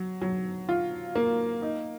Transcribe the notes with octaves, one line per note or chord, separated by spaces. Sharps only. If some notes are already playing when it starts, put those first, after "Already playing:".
Already playing: F#3
F#3
F4
A#3
D#4